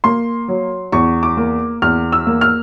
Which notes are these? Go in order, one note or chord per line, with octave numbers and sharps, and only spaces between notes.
A#3 C6
F#3
E2 C#6
D6
A#3
E2 F6
E6
A#3
F6